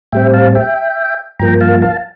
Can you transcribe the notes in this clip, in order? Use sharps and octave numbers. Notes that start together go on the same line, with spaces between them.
A2 G3 C4 E5 G5
F5 A5
E5 G5
G2 F3 A#3 G5 A#5
F5 A5
F5 A5